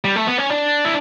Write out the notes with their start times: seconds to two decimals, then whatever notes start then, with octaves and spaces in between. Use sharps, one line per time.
0.04 G3
0.16 A3
0.27 B3
0.38 C#4
0.50 D4
0.85 E4